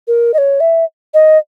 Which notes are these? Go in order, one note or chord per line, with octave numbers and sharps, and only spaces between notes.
A#4
D#5
C#5
E5
D#5